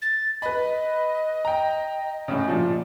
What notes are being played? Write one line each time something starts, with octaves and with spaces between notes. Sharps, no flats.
A6
B4 D#5 B5
G5 A#5
A2 C#3
A#2 F3